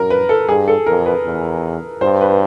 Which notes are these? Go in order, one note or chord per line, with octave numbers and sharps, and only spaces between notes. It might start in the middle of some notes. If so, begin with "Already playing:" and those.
Already playing: F#2 A#4
B4
A4
G2 G#4
A4
F2 A#4
B4
E2
G2 C5
B4